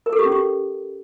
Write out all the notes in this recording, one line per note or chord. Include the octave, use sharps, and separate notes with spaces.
A#4
A4
G4
C#4
G4